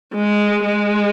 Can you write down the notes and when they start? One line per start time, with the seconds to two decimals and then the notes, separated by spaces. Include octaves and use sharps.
0.14 G#3
0.64 G#3